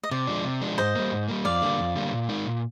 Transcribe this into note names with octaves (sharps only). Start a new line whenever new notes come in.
D#5
C3 D5
F3 G#3 D4
C3
F3 G#3 D4
G#2 C5 D#5
G3 A#3
G#2
G3 A#3
F2 D5 F5
D3 G3 A#3
F2
D3 G3 A#3
A#2
G#3 D#4 A#4
A#2